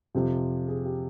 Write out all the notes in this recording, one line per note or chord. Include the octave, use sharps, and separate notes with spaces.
F2 C3 F3 G4
G#4
G4